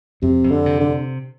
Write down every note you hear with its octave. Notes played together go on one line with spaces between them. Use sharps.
F2 C3
F2
D3
C3
D3